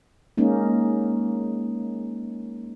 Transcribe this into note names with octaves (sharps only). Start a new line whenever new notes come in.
G#3 A#3 C#4 D#4